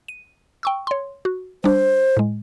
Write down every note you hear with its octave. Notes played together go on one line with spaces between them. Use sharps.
D#7
G5 C#6 E6
C#5 C6
F#4
G3 D4 C5
A2 G#3